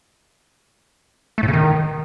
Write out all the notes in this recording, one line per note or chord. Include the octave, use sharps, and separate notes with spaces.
A3
A2
C#3
D#3